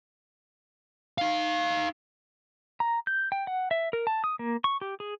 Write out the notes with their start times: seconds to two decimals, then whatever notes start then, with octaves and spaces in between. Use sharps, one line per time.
1.18 D#4 F5
2.80 A#5
3.07 G6
3.32 G5
3.47 F#5
3.71 E5
3.93 A#4
4.07 A5
4.24 D#6
4.39 A#3
4.64 C#6
4.81 G4
5.00 G#4